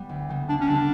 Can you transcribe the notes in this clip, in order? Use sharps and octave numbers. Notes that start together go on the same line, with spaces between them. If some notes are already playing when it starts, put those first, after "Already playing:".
Already playing: G3 B3
D2
C#3 G3 B3
D2 D4
C#4
C#3 G3 B3 D4